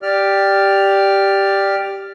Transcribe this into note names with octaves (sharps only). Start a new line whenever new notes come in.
G4 D5 F6